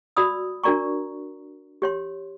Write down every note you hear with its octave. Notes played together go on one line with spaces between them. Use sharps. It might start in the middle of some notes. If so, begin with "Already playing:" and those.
F#4 D5 B5 D#6 E6
D4 F#4 A#4 D5 A#5 C#6
G4 C#5 C6